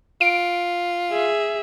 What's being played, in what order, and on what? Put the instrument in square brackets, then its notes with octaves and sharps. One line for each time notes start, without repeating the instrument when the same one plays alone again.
[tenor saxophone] F4 [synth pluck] D7
[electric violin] G#4 E5